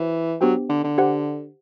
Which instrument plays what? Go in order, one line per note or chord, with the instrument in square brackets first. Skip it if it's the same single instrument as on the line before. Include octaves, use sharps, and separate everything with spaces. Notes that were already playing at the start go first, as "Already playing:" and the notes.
Already playing: [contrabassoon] E3 [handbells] F#4 C5
[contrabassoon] F#3 [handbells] B3 D4 G4 C5 G5
[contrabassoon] D3
D3
[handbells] G4 C5 F#5